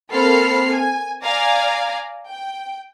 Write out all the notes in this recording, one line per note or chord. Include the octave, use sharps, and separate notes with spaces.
A#3 C4 A4 B5 F6 C7
G#5
D5 F5 G#5 A#5
G5